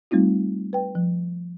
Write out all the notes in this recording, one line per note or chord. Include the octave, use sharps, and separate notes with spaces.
G3 A3 C4 D#4 F4
B4 G5
F3